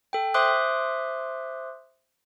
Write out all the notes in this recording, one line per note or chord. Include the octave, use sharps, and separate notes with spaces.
A4 G5
C5 E5 C6 D6 D#6 F#6